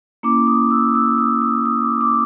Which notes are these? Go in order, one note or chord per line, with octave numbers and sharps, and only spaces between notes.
A#3 C#4 E4 D6
D#6
E6
D#6
E6
D#6
D#6
D#6
D6
D6